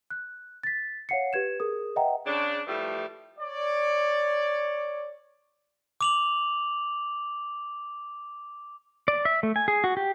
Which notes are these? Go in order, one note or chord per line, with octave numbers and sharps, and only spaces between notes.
F#6
A6 B6
C#5 F5 F#5 C7 C#7
G4 B4 G#6 E7
G#4 A#4 D#6
B4 D#5 E5 F#5 G5 A#5
C#3 D4
A2 E3 F3 G3 A3
C#5 D5
D6 F7 F#7
D5
E5
A3
G#5
G#4
F#4
G4